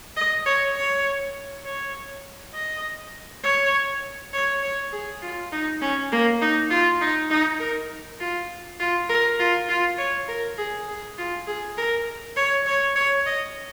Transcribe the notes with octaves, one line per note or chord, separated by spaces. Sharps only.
D#5
C#5
C#5
C#5
D#5
C#5
C#5
C#5
G#4
F4
D#4
C#4
A#3
D#4
F4
D#4
D#4
A#4
F4
F4
A#4
F4
F4
C#5
A#4
G#4
G#4
F4
G#4
A#4
C#5
C#5
C#5
D#5